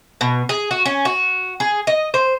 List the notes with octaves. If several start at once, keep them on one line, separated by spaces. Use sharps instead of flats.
B2
G#4
F#4
C#4
F#4
G#4
D#5
C5